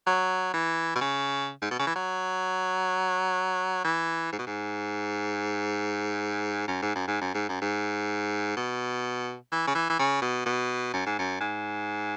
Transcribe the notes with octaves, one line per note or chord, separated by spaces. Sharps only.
F#3
E3
B2
C#3
G#2
B2
C#3
E3
F#3
E3
G#2
B2
G#2
F#2
G#2
F#2
G#2
F#2
G#2
F#2
G#2
B2
E3
C#3
E3
E3
C#3
B2
B2
F#2
G#2
F#2
G#2